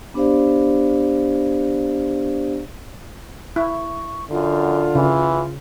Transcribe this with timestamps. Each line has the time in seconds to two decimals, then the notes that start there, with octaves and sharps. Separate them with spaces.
0.14 B3 D4 G4 C5 D5 F5
3.56 E4 C#6
4.31 F#2 D3 F4
4.95 C#3 E3